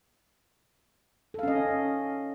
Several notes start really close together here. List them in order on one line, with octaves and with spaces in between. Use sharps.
A4 F5 C#4 D#5